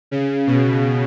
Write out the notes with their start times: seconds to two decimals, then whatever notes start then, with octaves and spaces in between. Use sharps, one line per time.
0.11 C#3
0.47 B2